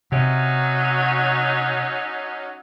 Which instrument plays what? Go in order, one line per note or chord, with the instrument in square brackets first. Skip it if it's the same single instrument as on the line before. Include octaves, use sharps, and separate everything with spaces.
[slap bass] C3 [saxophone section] F#3 C#4 D#4